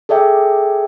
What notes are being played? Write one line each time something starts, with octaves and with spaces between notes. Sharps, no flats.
G#4 A4 D5 E5 G5